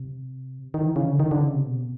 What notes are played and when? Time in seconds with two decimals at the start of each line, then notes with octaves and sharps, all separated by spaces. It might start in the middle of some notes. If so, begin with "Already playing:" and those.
Already playing: C3
0.74 D#3
0.86 E3
0.96 C#3
1.08 D3
1.20 D#3
1.31 D3
1.42 C#3
1.55 C3
1.66 B2